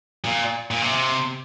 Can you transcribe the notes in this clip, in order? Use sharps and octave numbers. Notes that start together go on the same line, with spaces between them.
A#2
A#2
C3